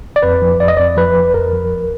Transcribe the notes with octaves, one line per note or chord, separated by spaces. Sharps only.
D5
F2 B4
F3
F2 D5
D#5
F2 D5
F3 B4
F2
F2 A#4
F3
D2